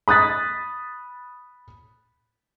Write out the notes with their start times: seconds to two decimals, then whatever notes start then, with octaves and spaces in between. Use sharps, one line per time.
0.08 B5 D#6 F#6 A6 B6